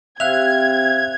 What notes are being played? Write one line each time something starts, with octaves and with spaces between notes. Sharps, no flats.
C3 C4 E5 F5 F#6 G#6 F7